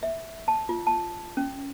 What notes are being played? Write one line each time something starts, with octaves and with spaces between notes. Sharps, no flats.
E5
A5
F4
A5
C#4